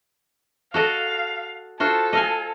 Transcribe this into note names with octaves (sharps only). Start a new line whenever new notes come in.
F#4 A4 D#5 F5
F4 F#4 A4 C5
D#5 F5 G#5